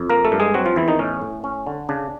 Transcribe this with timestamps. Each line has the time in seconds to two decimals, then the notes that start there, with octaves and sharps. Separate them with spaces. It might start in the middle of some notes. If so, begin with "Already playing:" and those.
Already playing: F2
0.10 A#3 A#4
0.25 A3 A4
0.32 G2
0.40 G#3 G#4
0.54 F#3 C4 F#4
0.66 F3 F4
0.76 E2 E3 E4
0.88 D#3 D#4
0.99 A2 C#4
1.22 A2
1.44 C#4
1.67 D3
1.89 C#3 D4